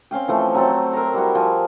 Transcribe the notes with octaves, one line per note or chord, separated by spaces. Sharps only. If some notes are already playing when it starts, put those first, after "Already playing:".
C4 C#4 F5 G5
E3 F3 A3
F#3 C4 A4
A#4 C5 A#5
G3 E4 F#4
F3 G#5